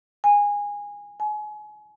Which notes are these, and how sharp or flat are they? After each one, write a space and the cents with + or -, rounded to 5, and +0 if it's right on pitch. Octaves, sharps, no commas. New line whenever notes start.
G#5 -20
G#5 +30